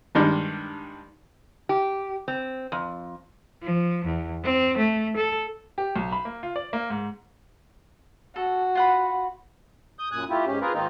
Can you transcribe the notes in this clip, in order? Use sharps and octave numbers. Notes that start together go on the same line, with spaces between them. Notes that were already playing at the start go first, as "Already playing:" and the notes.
G2 D#3 G3 G#3 D4
G4
C4
F2
F3
E2
C4
A3
A4
G4
B1
B5
A#3
F4
D5
A#3
G#2
F#4 A4
F4 F#5 B5
D#6 G6
F#2 A#2 G#5 D#6 F#6
A3 E4 F4 G4
G#2 C#4 G4
A#3 C4 F4 G#4 A#4 B4
G#2 D#3 A#3 C4 D#4 F4